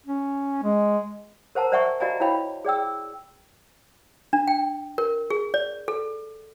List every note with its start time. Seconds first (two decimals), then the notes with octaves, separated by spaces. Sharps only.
0.06 C#4
0.63 G#3
1.55 A#4 C5 F#5 A5 A#5
1.72 C5 D5 E5 F#5 G#5 C#6
2.00 F#4 D5 D#5 F5 G#5 A#5
2.20 E4 F#4 C#5 F5 G5 B5
2.65 G#4 D5 G5 E6
4.33 D4
4.48 G5
4.98 A#4
5.30 G#4
5.54 D5
5.88 A4